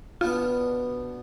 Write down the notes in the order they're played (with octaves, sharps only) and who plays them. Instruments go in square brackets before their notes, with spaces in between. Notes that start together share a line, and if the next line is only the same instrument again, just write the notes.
[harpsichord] B2 B3 D4 G4 B4 [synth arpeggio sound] F4